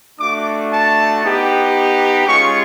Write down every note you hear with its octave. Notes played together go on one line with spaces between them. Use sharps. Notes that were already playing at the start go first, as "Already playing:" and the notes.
A3 D4 F#4 D6
A5
B3 D#4 G4
G#3 C#4 F4 C#6